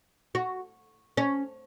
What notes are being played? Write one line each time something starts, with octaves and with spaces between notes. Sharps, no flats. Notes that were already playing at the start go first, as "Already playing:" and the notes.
F#4
C#4